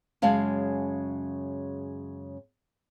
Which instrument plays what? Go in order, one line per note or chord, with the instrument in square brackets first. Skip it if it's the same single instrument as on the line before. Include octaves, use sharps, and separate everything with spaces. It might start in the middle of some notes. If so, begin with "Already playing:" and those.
[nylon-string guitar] F#2 C#3 G#3 G#4 F5 A5